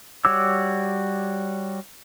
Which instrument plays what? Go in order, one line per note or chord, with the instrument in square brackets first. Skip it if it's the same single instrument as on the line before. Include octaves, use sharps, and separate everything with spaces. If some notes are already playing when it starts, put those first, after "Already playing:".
[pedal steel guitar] G3 F#4 C#5 D6 E6